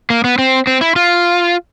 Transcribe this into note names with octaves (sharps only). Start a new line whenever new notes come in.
A#3
B3
C4
C4
E4
F4